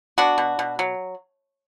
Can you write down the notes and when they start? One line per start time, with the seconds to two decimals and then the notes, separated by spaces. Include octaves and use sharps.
0.18 B3 D4 F#4
0.38 B2
0.59 B2
0.79 F#3